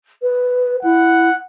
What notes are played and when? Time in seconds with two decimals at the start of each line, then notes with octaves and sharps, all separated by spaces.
0.22 B4
0.83 E4 F#5